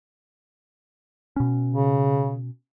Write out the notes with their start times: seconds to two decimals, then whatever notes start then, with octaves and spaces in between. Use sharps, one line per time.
1.36 B2 C#4
1.74 C#3